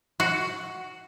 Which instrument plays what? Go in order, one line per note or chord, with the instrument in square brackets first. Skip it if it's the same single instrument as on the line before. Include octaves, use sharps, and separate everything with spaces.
[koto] F#4